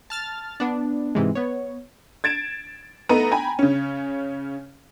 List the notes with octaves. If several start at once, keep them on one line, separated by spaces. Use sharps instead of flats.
A5 F6 A6
B3 D4
G#2 C3 E3 G#3
B3 C#5
G#6 A6 D7 E7
A3 B3 D#4 A#5 D#7
G5 G#5 A#5 B5
C#3 C#4